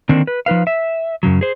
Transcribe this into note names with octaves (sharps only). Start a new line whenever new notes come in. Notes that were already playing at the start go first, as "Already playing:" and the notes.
D3 D#3 A#3 C4 D4
B4
F3 D#4 B4 F5
E5
F#2 C#3 F#3
G#4 C5